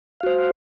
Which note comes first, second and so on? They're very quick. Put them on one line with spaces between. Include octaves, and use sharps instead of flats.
F5 F#4 C5